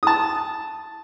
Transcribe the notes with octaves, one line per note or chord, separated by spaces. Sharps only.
A5 D#6